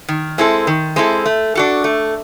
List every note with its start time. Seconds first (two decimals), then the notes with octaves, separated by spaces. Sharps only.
0.08 D#3
0.38 G#3 C4 E4 A4
0.67 D#3
0.96 G#3 C4 E4 A4
1.26 A3
1.55 D4 F#4 A4
1.84 A3